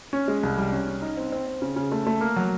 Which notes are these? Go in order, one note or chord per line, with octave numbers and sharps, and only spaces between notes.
C#4
G#3
C2
G3
C#4
C#4
D#4
C4
C4
C4
C#3
C#3
A3
A3
A#3
F#3